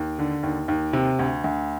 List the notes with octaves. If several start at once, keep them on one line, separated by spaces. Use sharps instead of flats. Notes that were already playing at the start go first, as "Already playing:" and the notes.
Already playing: D#2
D3
D#2
D#2
C3
D2
D2